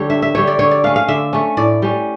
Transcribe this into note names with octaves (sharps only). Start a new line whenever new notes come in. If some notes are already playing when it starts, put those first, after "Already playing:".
Already playing: D3 G3 A4 C#5
G2 E5
E5
D3 G3 C#5
D5
D3 C#5
D5
A3 C#4 F5
F5
D3 E5
A3 C#4
A2 D5
G3 C#4